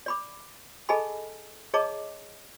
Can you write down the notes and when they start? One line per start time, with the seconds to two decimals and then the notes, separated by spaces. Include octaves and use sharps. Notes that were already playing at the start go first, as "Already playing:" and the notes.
0.06 D5 B5 D6
0.89 G#4 A4 D#5 G#5 A5 B5
1.74 G#4 C#5 D#5 A5 A#5 D6